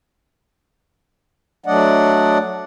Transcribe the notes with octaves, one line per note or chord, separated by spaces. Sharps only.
F#3 A3 D4 D5 D#5 F#5